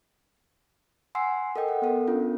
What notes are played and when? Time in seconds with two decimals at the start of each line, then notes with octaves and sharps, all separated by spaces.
1.15 F#5 G#5 C6 E6 C7
1.56 A4 A#4 D#5 G5
1.68 F#5
1.82 B3 A4 A#4
2.07 B3 C#4 D4 F4